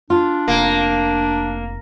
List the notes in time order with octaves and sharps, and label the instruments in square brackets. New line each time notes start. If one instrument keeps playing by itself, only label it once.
[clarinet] D4 [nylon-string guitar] F4
[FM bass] F1 [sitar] A#3